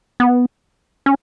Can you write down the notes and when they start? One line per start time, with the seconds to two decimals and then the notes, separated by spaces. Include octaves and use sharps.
0.20 B3
1.06 C#4